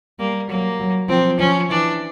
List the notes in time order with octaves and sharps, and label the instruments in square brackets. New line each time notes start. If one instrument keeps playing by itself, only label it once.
[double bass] G3 [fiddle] A#3
[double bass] F#3 [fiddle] A#3
[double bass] F#3
[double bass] F3 [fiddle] C4
[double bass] F3 [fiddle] C#4
[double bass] E3 [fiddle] D4